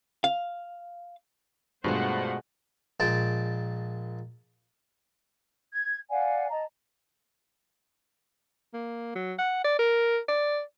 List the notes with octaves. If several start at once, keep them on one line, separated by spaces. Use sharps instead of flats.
F5
G2 B2 G#3 A3 F4 G#4 C5 F#5
A#1 G#3 G5 A5
G#6
D5 F5 F#5 G#5
D#5 A5 A#5
A#3
F#3
F#5
D5
A#4
D5